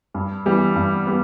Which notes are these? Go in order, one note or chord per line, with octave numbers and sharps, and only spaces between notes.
G2
E3 G3 B3
G2
G3 B3